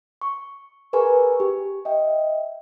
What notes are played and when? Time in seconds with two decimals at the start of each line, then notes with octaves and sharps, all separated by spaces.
0.21 C#6
0.93 G#4 A#4 B4 G#5 C#6
1.40 G4
1.85 D#5 E5 G5